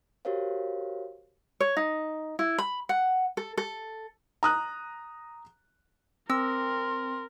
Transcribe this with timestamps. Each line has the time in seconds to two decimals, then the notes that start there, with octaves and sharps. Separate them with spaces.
0.25 F#4 G4 A#4 C5 C#5 F5
1.60 C#5
1.77 D#4
2.39 E4
2.58 B5
2.89 F#5
3.37 A4
3.57 A4
4.43 A#5 D#6 F#6
6.30 C4 A#4 C6 E6